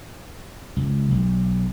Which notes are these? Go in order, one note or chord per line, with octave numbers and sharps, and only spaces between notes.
C#2
B1